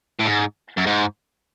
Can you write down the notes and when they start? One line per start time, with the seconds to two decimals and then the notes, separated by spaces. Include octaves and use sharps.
0.20 A2
0.26 G#2
0.78 F#2
0.87 G#2